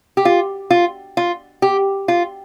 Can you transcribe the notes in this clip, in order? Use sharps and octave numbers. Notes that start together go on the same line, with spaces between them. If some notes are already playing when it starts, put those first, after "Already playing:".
G4
F4
F4
F4
G4
F4